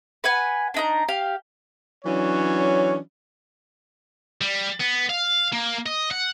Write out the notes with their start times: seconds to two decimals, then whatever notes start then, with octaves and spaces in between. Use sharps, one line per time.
0.24 B4 F#5 G#5
0.74 D4 D#4 A#5
1.09 G4 F5
2.05 E3 F#3 C#4 D4 C#5
4.41 G3
4.81 B3
5.10 F5
5.53 A#3
5.86 D#5
6.11 F#5